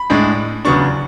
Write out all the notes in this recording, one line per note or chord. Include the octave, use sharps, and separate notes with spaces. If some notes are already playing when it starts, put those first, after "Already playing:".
Already playing: B5
A2 G#3 D4
E2 C#3 F#3 B3 D4 C#6